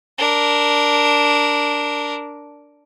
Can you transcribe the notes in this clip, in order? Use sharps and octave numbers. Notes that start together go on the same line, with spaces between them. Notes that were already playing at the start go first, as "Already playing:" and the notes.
D4 A#4